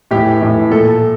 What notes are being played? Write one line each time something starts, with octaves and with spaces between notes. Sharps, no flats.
A2 E3 G4
A2 E3
A#2 A4